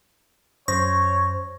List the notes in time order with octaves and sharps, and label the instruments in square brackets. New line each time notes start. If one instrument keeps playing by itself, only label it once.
[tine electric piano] F#2 C5 A#6 [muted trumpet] C#5 [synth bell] C#6